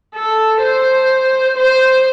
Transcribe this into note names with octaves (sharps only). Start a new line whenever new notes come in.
A4
C5
C5